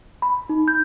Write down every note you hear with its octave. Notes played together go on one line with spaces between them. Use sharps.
B5
D#4
G6